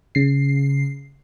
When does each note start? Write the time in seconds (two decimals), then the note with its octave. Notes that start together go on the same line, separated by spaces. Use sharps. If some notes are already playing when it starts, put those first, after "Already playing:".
0.15 C#3 C7